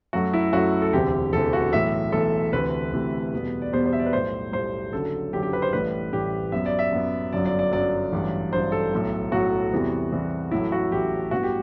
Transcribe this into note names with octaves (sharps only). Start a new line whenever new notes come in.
F#2 F#3 A3 F#4
E4
F#2 F#3 A3 F#4
A4
E1 D2 C3 E3 G4
E1 D2 C3 E3 A4
F#4
B1 A2 E3 E5
B1 A2 E3 A4
D2 C3 E3 A3 B4
D2 C3 E3 A3
E2 B2 G3 B3
D5
E2 B2 G3 B3 C5
C5
E5
D5
B4
B1 A2 G3 C5
B1 A2 G3 C5
F#1 F#2 D3 F#3 A4
F#1 F#2 D3 F#3 G4
G4
B4
C5
A1 A2 G3 B4
A1 A2 G3 G4
F#2 F#3 B3 E5
D5
E5
F#2 F#3 B3
G1 F#2 F#3 D5
D5
D5
G1 F#2 F#3 D5
A1 G2 F#3
A1 G2 F#3 C5
A4
B1 A2 F#3
B1 A2 F#3 F#4
E2 C3 E3 G3 B3
E2 C3 E3 G3 B3
A1 A2 F#3 A3 E4
F#4
A1 A2 F#3 A3 G4
A1 G2 E3 B3 F#4
G4